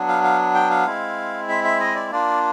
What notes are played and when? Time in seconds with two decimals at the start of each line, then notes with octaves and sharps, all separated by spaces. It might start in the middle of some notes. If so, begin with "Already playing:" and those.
Already playing: F#3 B3 D4
0.08 F5
0.23 F5
0.54 G5
0.70 F5
0.86 G#3 C4 E4
1.49 E5
1.64 E5
1.80 D#5
1.95 D5
2.11 A#3 D4 F4 D5